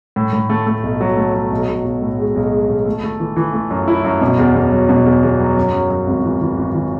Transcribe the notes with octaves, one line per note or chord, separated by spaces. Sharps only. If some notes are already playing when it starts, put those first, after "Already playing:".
A2
A2
A3
A3
B1
F#3
A3
F#3
B1
B1
B1
A2
G#3
B1
G#3
B1
A3
A3
E3
E3
A3
F#2
E4
F#2
B2
E2
E2
F#3
B2
E2
E2
F#3
F#2
F#2
F#2
G#1
E3
E3
G#1
E3